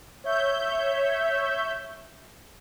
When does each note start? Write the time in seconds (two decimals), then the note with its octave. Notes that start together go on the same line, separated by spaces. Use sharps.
0.24 C#5 E5 G6